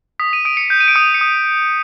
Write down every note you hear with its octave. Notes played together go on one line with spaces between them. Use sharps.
D#6 B6
D#7
D#6 D7
C#7
G6
D#7
D7
D#6 C#7
C#7
D#6